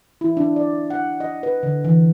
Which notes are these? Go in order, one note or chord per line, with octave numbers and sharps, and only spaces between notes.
E4
D4
D5
F#5
D#5
B4
D3
E3